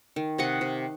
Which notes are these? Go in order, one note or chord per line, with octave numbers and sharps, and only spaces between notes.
D#3
C3 D#5 F#5
C3